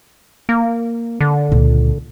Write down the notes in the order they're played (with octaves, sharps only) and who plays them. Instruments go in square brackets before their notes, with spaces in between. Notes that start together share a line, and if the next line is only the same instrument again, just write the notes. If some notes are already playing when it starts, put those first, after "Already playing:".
[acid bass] A#3
D3
[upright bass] C#2 A#2